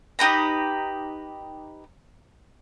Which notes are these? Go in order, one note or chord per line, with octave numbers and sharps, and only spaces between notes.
D#4 G4 B4 A#5